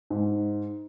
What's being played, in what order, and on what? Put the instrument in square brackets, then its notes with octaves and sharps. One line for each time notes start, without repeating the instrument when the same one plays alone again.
[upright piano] G#2